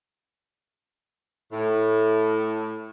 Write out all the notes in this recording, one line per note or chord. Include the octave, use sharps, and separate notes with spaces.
A2